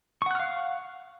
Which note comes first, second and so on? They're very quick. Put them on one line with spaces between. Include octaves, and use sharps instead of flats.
C#6 F#5 F#6 F6 F5